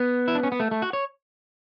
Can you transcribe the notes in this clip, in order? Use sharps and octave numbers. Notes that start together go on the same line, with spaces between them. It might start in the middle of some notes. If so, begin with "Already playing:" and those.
Already playing: B3
E4
D4
C#4
B3
A3
A3
F#4
C#5